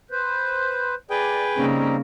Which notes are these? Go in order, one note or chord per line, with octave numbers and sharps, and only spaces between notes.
B4 C5
G#4 B4 D5 G5
C#3 G3 A#3 C4 D#4